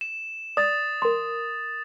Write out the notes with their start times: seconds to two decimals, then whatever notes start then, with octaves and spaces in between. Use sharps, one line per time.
0.01 E7
0.57 D5 D#6 A6
1.02 A#4 C6